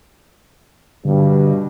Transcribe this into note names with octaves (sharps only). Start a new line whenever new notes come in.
G2 B2 D3